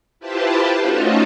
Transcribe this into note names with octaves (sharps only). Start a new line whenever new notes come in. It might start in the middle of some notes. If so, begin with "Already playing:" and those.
E4 F4 G4 B4 C5 A5
A3 C#4 D#4 F4 F#4 A4